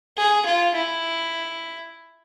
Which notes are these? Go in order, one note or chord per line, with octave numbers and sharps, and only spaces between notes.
G#4
F4
E4